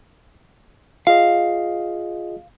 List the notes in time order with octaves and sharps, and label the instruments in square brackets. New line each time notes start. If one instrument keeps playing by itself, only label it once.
[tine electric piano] F4 G#4 D#5 [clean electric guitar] F5